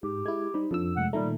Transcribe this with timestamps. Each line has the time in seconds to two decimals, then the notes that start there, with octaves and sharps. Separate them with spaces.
0.03 G#2 G4
0.26 G#3 E4 G#6
0.54 G3 D#4 C5 B5
0.71 F2 F3 D4 A4 E6
0.97 C3 G#3 A3 F#5
1.13 A#2 D#3 G3 A3 A#5